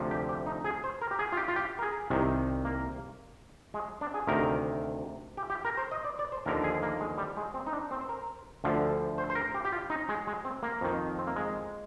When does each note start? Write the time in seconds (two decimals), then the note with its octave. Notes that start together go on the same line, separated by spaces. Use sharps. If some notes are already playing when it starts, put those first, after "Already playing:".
Already playing: D2 C3 F3
0.11 G4
0.29 G4
0.46 D#4
0.64 G#4
0.84 C5
1.01 A#4
1.11 G4
1.19 G#4
1.32 F4
1.37 G4
1.48 F4
1.56 G4
1.79 A#4
1.82 G#4
2.10 C2 C3 D#3
2.65 A#3
3.74 G#3
4.01 D4
4.14 G#4
4.27 D2 C3 D#3 A#4
5.37 G4
5.50 G4
5.65 A#4
5.77 C5
5.91 D#5
6.04 D5
6.19 D5
6.32 C5
6.46 D#2 D3 F3 A#4
6.64 G#4
6.82 A#3
7.00 G#3
7.18 G3
7.37 G#3
7.54 C4
7.67 D#4
7.73 D4
7.91 C4
8.01 C5
8.09 A#4
8.64 D2 D3 F3
9.18 C5
9.30 C5
9.35 A#4
9.55 G4
9.65 G4
9.72 F4
9.90 D#4
10.09 G#3
10.27 G#3
10.45 C4
10.63 A#3
10.81 F2 D#3
11.19 C4
11.27 A#3
11.36 G#3